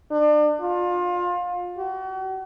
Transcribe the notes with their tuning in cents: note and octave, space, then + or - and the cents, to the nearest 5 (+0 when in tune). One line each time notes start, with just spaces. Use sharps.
D4 +35
F4 +25
F#4 +40